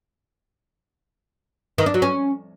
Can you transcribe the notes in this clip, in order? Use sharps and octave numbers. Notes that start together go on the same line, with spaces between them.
D#3
D4
F#3
C#4